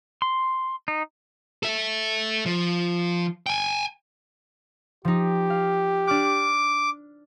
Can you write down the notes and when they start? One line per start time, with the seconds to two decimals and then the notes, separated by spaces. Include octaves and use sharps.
0.22 C6
0.88 D#4
1.63 A4 E5
2.46 F3
3.46 G5 G#5
5.05 F3 D#4 G4
5.50 F5
6.07 D4 D6 F6 F#6